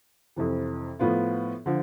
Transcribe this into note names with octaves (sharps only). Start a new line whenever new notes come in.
F2 C3 E3
A2 F3 B3 F4
D3 F3